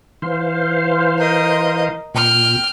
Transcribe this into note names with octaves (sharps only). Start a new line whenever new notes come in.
E3 C5 F5
A#4 D#5
A#2 G5 F6